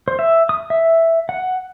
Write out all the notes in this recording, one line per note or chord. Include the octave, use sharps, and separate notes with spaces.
C5
E5
D#6
E5
F#5